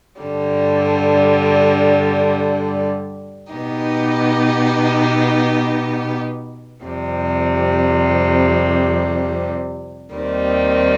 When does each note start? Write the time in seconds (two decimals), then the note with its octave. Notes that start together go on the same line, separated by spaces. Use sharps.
0.20 G2 D3 G3
3.52 B2 B3 D#4 G4
6.83 F2 C3 G3
10.14 D#2 D#3 G3 C4